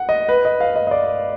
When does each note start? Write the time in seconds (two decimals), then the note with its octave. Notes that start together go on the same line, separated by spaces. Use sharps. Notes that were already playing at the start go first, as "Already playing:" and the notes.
Already playing: F#5
0.09 D#5
0.29 B4
0.45 D#5
0.60 F5
0.76 D#5
0.87 D#5
0.91 D5